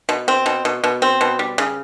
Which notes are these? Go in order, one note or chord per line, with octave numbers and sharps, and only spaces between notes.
B2
C4
B2
B2
B2
C4
B2
G3
C#3